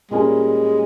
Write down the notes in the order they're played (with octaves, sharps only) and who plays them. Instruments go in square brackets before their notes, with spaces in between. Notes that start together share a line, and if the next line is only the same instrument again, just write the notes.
[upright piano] A#2 G3 A#3 C#4 [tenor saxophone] G#3